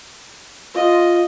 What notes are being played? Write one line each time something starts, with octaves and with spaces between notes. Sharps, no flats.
F4 D#5